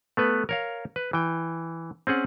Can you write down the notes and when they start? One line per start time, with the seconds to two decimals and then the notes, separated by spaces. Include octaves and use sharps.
0.17 A3 B3 B4
0.49 A#4 C#5 F5
0.96 B4
1.13 E3 G5
2.07 C4 C#4 G#4 F#5